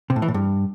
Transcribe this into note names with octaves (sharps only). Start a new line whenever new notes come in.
C3
A2
E3
A2
G2